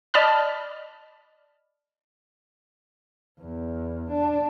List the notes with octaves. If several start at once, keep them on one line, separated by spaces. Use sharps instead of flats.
D5 D#5 A5 B5 F6
E2
D4